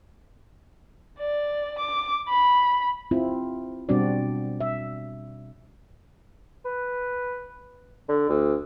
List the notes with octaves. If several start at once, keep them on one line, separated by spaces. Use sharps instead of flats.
D5
D6
B5
C4 E4 F4
B2 G3 C4 D4 F#4 D5
E5
B4
D3
D2